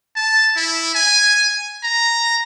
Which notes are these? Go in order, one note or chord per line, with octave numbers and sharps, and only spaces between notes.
A5
E4
G#5
A#5